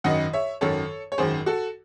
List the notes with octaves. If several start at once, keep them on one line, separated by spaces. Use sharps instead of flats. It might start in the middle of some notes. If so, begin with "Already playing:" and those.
G#1 F#2 D#3 D#5 F#5
C#5 E5
G#1 F#2 D#3 A4 C#5
C#5
G#1 F#2 D#3 G#4 C5
F#4 A4